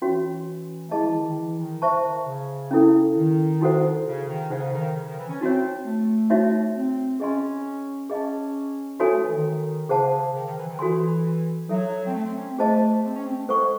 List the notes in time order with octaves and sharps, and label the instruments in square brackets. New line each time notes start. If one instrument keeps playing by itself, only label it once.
[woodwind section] E3 [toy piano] C#4 F#4 C#5
[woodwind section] A3
[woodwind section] G#3 [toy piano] E4 G#4 D#5 A5
[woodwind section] E3
D#3
D#3
E3
D#3
[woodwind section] C#3 [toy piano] C5 E5 A5 C#6
[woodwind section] D#3
C#3
[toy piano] C#4 E4 A4
[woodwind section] D#3
[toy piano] D#4 F#4 A4 C5 F#5
[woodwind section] C#3
D#3
[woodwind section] C#3 [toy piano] D#4 A4 C5 F#5
[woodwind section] D#3
C#3
D#3
E3
C#4
[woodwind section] C4 [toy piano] D#4 F#4 C#5
[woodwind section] A3
[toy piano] D#4 F#4 C#5 E5
[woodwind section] C4
[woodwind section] C#4 [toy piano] G#4 D#5 G#5 C6
[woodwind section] C#4 [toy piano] G#4 D#5 F#5 A5
[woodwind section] C#4 [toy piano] D#4 F#4 A4 C#5 G#5
[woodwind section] A3
E3
D#3
[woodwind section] C#3 [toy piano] G#4 C5 F#5 A5
[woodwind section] D#3
D#3
E3
D#3
[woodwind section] E3 [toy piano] F#4 A4 C#5 G#5 C6
[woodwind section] F#3 [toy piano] D#4 A4 C#5 E5
[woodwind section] C4
A3
C4
C#4
C4
[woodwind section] A3 [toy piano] G#4 C5 D#5 A5
[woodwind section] C4
C#4
C4
A3
[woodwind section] G#3 [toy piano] A4 C5 F#5 C#6